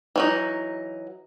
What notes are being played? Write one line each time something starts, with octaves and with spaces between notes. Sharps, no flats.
E3 F#3 D#4